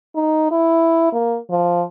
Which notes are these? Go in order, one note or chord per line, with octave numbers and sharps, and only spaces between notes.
D#4
E4
A#3
F3